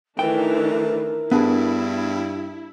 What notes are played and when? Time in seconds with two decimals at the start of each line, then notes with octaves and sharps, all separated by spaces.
0.19 D#3 E3 A3 D4 A#4 G5
1.31 G2 B3 D4 E4 G#4